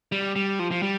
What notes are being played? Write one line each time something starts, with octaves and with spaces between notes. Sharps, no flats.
G3
G3
F3
F3
G3